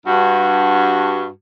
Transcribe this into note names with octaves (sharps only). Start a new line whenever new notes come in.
G2 F#4